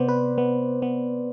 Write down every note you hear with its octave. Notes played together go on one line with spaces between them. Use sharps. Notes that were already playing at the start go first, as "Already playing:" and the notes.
Already playing: C3 B3 C5 D5
B4
B3
B3